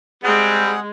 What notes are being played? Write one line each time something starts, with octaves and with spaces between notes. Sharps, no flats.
G3 G#3 C4 G#4 F#5